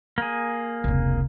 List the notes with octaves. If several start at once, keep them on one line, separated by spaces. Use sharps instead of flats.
A#3 G#4
F1 C#2